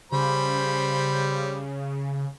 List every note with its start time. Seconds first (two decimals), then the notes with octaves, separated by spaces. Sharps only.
0.12 C#3 G3 C5 B5